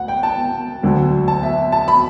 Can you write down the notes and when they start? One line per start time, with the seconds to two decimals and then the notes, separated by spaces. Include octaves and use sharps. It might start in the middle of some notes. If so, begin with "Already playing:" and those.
Already playing: D2 F#5
0.08 G5
0.23 A5
0.83 D2 D3 F#3
1.28 A5
1.43 E5
1.72 A5
1.88 B5